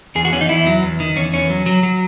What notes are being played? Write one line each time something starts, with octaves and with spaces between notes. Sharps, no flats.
E2 G#4
F#4
E2 C#4
D#4
E2 E4
F#3
E2
D#3
E2 C#4
E2 C#4
F#3
F#3
F#3